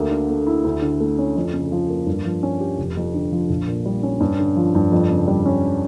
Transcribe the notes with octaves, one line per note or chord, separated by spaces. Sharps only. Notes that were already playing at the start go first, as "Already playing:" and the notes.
Already playing: D2 A#3
D3
A3
E4
D2
D3
A3
C#4
F2
C#3
F3
A#3
G2
F3
C#4
G4
F1
F2
D3
F3
A#1
A#2
G3
C#4
G2
D3
F3
G2
F2
C#3
G3
C#4